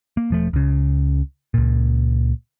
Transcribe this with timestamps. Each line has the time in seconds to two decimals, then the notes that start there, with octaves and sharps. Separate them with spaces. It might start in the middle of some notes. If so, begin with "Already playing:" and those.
0.17 A#3
0.30 E1 F3 A3
0.53 C#2 C#3
1.54 C#2 A#2